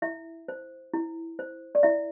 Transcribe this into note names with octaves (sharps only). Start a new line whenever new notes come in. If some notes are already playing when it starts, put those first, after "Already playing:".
E4 E5
C5
E4
C5
D5
E4 E5